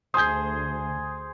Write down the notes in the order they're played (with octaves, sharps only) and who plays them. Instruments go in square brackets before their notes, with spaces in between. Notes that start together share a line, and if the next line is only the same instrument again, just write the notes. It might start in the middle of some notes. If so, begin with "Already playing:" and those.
[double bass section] D2 [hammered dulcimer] G#4 C5 [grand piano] D#6 G6